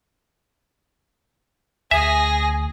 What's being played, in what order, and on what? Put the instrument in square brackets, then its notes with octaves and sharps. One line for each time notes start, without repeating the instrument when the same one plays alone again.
[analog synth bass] D2 [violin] G#4 A#6 [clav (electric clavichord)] E5 [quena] G#5